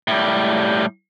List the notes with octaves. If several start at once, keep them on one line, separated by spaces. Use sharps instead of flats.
A2 G3